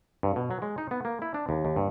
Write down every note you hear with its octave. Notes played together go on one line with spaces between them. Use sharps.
G2
B2
F#3
G#3
D#4
B3
A#3
E4
D4
D#2
D#2
G2